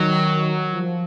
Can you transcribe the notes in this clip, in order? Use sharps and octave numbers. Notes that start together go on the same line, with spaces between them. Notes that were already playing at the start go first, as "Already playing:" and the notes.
Already playing: D#3 F#3
F3